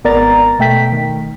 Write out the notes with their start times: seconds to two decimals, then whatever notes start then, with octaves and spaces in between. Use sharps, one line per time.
0.04 G#1 B3 A#4 D5 A#5 A6
0.59 B2 A3 G5 B6
0.92 D#3